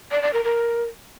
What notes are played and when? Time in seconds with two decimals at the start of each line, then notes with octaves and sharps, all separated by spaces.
0.11 D5
0.22 D5
0.33 A#4
0.44 A#4